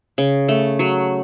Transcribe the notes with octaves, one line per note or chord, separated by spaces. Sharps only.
C#3
A3
F#3